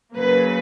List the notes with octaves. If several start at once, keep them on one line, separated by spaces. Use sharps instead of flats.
C#3 F#3 A#3 B4